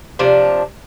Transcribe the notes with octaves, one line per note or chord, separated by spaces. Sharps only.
C3 F3 D4